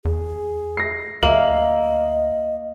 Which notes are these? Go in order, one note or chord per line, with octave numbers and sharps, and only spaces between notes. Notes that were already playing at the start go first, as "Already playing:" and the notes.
E2 G#4
A#6 C7
D2 A#3 D#5 E5 F#7